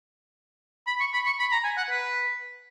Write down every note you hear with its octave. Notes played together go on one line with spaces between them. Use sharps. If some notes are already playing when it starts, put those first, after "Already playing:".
B5
C#6
B5
C#6
B5
A#5
G#5
F#5
B4